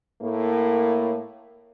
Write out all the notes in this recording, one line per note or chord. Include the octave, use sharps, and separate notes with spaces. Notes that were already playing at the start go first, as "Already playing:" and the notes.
A2 A#3